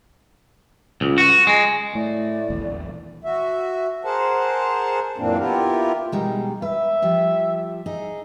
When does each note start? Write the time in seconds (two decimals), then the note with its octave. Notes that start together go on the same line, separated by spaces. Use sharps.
1.01 C#2
1.18 F#4
1.47 G#3
1.95 A2 A3 D5
2.50 D#1 A#1 E2
3.24 F#4 E5
4.05 G#4 A#4 C5 F#5 A5
5.18 F#2 A#2 E3 A#3 C4 D4
5.38 B3 E4 F4 G4 A#4
6.12 B2 G3 G#3 D#4
6.62 B4 E5
7.02 F3 G3
7.86 D#4 G#4